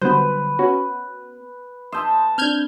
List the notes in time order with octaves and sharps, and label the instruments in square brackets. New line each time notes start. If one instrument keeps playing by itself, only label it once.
[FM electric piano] D3 F#3 G3 [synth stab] B3 C5 [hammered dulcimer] B4
[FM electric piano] B3 [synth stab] C#4 F#4
[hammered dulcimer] E5 A5 [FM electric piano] C6 D#6 G6
[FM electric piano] C4 D4 [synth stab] F6 G6 G#6